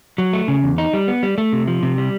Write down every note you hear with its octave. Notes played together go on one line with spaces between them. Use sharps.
F#3
A3
C#3
E2
D#4
G3
B3
G3
A3
C3
F3
C3
G3